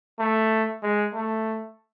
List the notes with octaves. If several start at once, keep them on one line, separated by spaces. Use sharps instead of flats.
A3
G#3
A3